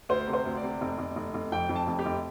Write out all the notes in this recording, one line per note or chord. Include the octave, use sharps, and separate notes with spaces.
D2 C5
C3
C5
D2
D5
C3
F1
F1
F1
F1
F2 G5
F2
A5
F1
G4
F1